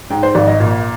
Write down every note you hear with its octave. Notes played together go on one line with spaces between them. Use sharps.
G#2 G5
C5
G#1 D5
D#5
A#2